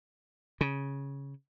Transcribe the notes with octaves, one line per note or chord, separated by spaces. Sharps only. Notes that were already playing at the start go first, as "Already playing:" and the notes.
C#3